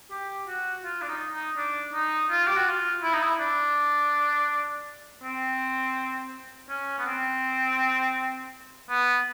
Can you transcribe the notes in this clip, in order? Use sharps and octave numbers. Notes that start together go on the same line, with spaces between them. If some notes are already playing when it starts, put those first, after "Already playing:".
G4
F#4
F4
D4
D#4
D#4
D4
D#4
F4
G4
F#4
F4
E4
D#4
E4
D4
C4
C#4
B3
C4
B3